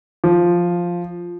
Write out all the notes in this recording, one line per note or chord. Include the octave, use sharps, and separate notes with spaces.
F3